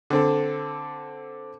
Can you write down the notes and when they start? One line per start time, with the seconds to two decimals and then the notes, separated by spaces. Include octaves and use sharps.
0.10 D3 C4 A4